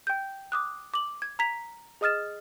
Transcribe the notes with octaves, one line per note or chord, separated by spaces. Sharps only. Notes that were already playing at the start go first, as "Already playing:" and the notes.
G5 G6
D6 D#6 F#6
D6 F#7
G#6
A#5 G#6 B6 F7
G#4 D#5 D#6 F6 A6 E7